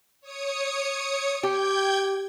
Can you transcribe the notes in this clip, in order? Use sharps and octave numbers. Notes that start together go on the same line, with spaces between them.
C#5 D#6 C#7
G4 G5 G6 G#6